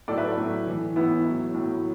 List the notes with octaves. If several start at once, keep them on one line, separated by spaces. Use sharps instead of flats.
A2 F#3 A4 D5
B4 E5
A4 D5
A2 F#3
A2 E3
A2 E3 B3 E4
A2 F#3
A2 F#3